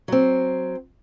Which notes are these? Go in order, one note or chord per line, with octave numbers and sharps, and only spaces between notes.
F#3 C4